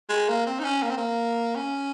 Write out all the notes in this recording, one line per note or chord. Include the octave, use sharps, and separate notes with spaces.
G#3
A#3
C4
D#4
C#4
A#3
C4
A#3
C#4